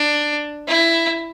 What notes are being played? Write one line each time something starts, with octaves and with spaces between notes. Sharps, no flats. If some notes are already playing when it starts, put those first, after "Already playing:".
Already playing: D4
E4